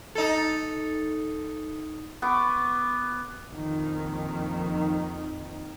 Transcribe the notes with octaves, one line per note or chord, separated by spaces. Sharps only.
D#4 A4
B3 C#6 D6
A#1 F2 D#3